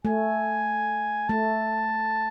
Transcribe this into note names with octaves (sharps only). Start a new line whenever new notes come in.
A3 G#5
A3 A5